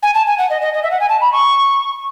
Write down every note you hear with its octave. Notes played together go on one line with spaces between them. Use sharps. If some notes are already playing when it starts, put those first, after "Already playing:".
G#5
A5
G#5
F#5
D#5
D#5
D#5
E5
F#5
G#5
A5
B5
C#6